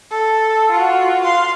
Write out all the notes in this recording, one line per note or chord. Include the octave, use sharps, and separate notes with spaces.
A4
F4 F#4
F5 C6